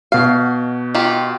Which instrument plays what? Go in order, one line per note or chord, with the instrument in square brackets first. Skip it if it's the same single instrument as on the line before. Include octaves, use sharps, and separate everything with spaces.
[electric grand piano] B2 F#4 [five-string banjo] F5
[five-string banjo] D#3 F4 G4